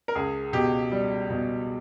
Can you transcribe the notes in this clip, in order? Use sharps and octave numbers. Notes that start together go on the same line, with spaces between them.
A#4
C#2 G#4
B2 G4
G3
B2